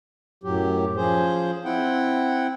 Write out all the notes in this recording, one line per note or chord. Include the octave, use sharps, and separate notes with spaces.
F#2 A2 F#3 G4
F3 C#4 G#4 C5
C4 E4 F#5 G5